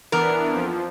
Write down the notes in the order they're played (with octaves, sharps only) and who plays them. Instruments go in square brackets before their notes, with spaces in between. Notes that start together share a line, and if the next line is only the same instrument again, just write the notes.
[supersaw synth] E3 B3 D4 [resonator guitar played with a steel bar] A#4
[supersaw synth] F2 F3